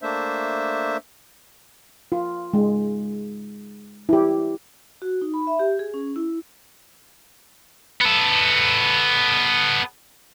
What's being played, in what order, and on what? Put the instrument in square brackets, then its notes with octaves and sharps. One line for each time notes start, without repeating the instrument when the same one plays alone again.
[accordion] A3 A#3 D4 C5 E5
[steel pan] F4
G#3
E4 G4
[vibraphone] F#4
D#4
B5
E5
G4
G#4
C#4
E4
[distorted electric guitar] B3 A4